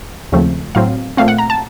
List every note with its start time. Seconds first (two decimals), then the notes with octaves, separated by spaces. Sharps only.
0.32 D#2 C#3 F3 A3 C4
0.75 A2 F#3 C4 F5
1.17 A#2 A3 C4 F5
1.28 F#5
1.38 A#5
1.50 A5